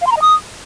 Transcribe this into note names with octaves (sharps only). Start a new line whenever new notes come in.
F5
C6
A#5
D#5
D#6